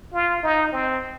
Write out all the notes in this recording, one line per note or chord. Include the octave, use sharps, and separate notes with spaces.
F4
D#4
C4